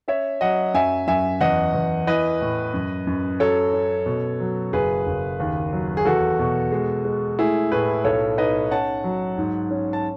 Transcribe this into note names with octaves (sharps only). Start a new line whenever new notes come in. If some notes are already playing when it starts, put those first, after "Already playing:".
C#4 C#5 E5
F#3 D#5 F#5
F#2 E5 G#5
F#2 E5 G#5
E2 D#5 F#5
E2
E3 B4 D#5
A2
F#2
F#2
F#3 A4 C#5
C#4
B2
F#3
F#1 G#4 B4
F#1
D#2
F#3
G#4
E2 F#4 A4
B2
G#3
G#3
A3 E4 G#4
A2 G#4 B4
B1 A4 C#5
D#4 B4 D#5
C#4 F#5 A5
F#3
G#2
C#4
A5